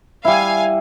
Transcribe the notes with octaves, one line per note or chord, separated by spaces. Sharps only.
G3 E4 F5 G#5